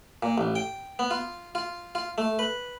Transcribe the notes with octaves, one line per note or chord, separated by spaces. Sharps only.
A#2
A1
G5
B3
F4
F4
F4
A3
B4